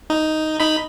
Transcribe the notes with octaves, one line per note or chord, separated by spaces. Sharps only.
D#4
D#4 B5